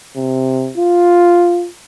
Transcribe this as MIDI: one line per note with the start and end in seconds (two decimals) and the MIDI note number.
0.16 0.71 48
0.78 1.68 65